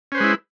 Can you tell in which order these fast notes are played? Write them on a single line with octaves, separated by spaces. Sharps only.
C#4 C5 B4 G#3 E4